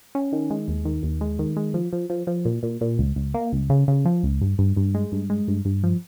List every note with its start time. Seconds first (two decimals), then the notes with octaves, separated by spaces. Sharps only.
0.15 C#4
0.32 D#3
0.50 G#3
0.68 D#2
0.85 D#3
1.03 D#2
1.21 G#3
1.39 D#3
1.57 G#3
1.74 F3
1.93 F3
2.10 F3
2.27 F3
2.45 A#2
2.63 A#2
2.81 A#2
2.99 C#2
3.16 C#2
3.34 A#3
3.53 C#2
3.70 C#3
3.88 C#3
4.05 F3
4.23 C#2
4.41 G2
4.59 G2
4.77 G2
4.95 G#3
5.12 G2
5.30 G#3
5.48 G2
5.65 G2
5.83 F3